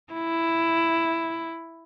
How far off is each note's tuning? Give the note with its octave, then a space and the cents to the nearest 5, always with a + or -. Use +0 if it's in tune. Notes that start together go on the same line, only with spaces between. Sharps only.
E4 +5